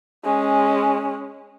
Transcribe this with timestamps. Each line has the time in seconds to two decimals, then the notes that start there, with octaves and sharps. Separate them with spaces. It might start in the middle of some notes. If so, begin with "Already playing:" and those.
0.25 G#3 C#4